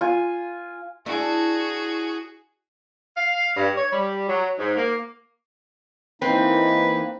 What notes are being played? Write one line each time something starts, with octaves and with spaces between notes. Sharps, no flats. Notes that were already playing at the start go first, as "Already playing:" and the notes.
F4 G#5
D4 E4 F#4 G#4
F5
G2
C#5
G3
F#3
G#2
A#3
E3 A#3 C4 D#4 B4